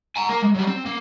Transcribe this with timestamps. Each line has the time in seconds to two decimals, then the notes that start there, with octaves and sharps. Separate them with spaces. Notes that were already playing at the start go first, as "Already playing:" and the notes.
0.16 G#5 A#5
0.29 A#3 A#4
0.42 G#3
0.55 F#3 G3
0.67 C4
0.86 A#3